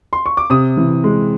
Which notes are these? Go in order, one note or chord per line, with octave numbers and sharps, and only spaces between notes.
C6
C#6
D6
C3 D#6
E3
G#3